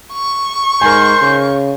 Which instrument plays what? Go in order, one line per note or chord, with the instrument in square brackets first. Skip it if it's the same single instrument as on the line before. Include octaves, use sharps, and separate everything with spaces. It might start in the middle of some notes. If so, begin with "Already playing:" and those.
[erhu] C#6
[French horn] G#2 [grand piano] A#4 G#5 [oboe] C5
[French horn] C#3